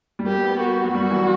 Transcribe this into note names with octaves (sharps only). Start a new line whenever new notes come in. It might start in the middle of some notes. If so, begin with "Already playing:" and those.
G3
A#3 G4
B3
A#3 F#4
F#3
G3 F#4
E3